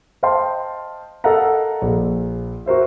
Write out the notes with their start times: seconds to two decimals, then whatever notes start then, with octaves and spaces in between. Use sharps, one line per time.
0.23 C5 D#5 F5 G5 A5 C6
1.24 A4 A#4 D#5 F5 F#5 A#5
1.82 A#1
2.66 F#4 A#4 C5 E5